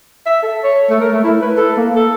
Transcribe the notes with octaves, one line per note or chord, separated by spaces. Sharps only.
E5
A4
C#5
A3
A#4
A3
E4
B4
A4
A#3
A4